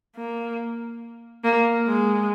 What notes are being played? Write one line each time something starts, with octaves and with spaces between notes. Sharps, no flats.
A#3
A#3
G#3